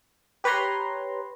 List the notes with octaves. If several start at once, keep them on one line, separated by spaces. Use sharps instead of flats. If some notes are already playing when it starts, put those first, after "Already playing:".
G4 B4 C#5 A#5 C6